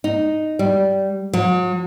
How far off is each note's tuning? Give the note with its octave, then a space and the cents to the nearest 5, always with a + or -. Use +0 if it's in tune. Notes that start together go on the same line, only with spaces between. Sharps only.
D#4 -5
G3 -15
F#3 -40